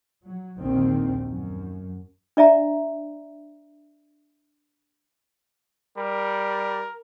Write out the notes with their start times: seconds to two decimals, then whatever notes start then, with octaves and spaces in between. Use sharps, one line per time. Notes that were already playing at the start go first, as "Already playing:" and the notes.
0.24 F#3
0.58 A#1 D#2 D3 D#3 C4
1.27 F#2
2.37 D4 D5 E5 A#5
5.98 G3 A#4